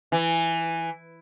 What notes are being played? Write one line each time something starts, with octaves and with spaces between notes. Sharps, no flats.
E3